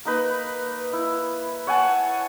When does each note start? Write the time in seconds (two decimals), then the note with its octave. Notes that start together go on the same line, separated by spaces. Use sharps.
0.05 A#3 D#4 B4
0.93 E4
1.67 C#5 F#5 G#5 A5